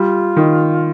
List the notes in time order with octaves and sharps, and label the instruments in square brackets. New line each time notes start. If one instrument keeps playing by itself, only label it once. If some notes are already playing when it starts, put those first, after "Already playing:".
Already playing: [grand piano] G3 [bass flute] F4
[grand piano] D#3